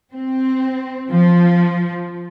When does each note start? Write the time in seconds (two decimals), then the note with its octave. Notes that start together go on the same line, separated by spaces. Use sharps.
0.13 C4
1.12 F3